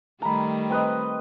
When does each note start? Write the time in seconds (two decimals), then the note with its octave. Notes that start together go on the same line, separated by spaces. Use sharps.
0.22 D#3 G3 A3 A#5 B5
0.70 C4 B4 D#5